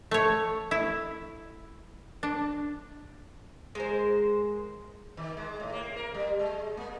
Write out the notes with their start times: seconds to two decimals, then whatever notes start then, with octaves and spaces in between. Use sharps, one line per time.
0.11 A3 C#5
0.71 E4
2.23 D4
3.75 G#3 A#4 C5
5.17 D#3
5.37 G#3
5.60 A2
5.72 A#3
5.97 A#4
6.14 G3
6.39 G#3
6.77 A#3